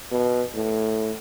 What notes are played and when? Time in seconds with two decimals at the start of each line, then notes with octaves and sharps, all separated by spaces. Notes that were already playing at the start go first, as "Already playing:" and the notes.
0.11 B2
0.55 A2